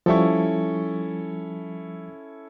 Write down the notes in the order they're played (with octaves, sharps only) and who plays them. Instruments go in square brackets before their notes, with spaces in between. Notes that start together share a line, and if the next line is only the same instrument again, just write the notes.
[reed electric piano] F3 G3 C#6 [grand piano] C#4 E4 A4